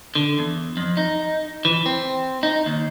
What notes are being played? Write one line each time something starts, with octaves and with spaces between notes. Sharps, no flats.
D3
E2
F2
D#4
E3
C4
D#4
D#2